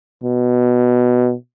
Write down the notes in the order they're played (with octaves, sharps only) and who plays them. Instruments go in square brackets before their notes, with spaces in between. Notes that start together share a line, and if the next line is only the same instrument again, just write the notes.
[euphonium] B2